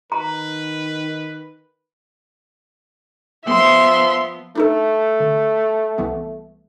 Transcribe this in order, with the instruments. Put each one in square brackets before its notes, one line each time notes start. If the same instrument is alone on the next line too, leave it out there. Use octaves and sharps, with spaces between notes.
[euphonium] D#3 [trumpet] B4 [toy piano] A#5
[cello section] F3 B3 [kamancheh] E5 C6
[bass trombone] A3 [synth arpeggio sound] D4 D#4 A4
[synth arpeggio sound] D3
C2 E3 B3